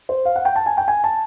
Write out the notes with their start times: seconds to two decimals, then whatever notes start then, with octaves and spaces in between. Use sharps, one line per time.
0.09 C5
0.25 F5
0.36 F#5
0.45 G5
0.56 A5
0.66 G#5
0.77 G5
0.88 G#5
1.04 A5